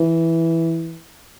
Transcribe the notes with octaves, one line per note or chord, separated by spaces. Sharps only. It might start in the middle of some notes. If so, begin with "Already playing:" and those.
Already playing: E3